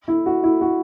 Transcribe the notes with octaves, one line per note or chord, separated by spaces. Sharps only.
E4
F#4
E4
F#4